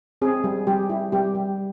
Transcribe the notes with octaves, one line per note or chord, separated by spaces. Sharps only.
C4 G#4
G3
G3 G4
E4
G3 G4
G3